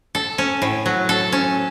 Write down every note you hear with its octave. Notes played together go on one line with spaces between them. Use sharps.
A4
C#4
A2
F#3
A4
C#4